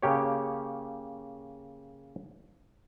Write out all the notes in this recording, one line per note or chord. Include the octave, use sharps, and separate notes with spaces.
C#3 A#3 G4 C#5